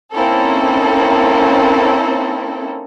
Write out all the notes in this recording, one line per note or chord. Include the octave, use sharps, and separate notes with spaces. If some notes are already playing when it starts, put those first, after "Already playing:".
A#3 C4 C#4 D#4 E4 A4